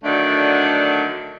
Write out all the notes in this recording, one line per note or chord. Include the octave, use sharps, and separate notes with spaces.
D3 D#3 F#3 A3 D5